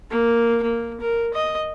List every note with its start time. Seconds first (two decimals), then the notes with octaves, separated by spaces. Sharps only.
0.11 A#3
0.63 A#3
1.01 A#4
1.34 D#5